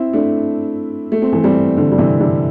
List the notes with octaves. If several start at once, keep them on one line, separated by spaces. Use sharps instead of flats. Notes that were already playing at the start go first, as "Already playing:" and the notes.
Already playing: C4 E4
A3 D4
A3
C4
E3 A3
G3 C4
D3
G3
C3 E3
D3 G3